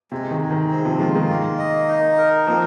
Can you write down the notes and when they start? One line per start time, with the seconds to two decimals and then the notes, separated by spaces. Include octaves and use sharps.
0.12 C3 G#3
0.31 D#3
0.41 G#3
0.51 D#3
0.71 C4
0.85 C3 F3
1.00 D#3 G#3 F4
1.15 D#3 G#3
1.29 A#3
1.59 D#5
1.88 D#4
2.18 A#4
2.47 F3 A#3 C4